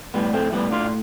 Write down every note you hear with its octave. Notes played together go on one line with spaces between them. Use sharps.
A2 G3 B3
A3 C4
A2 G3 B3
D4 F4